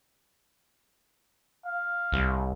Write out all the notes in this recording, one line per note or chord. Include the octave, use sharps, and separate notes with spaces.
F5
C2